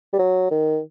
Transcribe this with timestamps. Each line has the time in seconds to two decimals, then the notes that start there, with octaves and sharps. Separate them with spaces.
0.13 G3
0.19 F#3
0.51 D#3